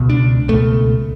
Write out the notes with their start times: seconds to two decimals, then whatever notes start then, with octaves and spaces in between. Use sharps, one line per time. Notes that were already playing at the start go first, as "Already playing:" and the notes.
Already playing: C#2 B2
0.10 D4
0.48 C#2 B2 A3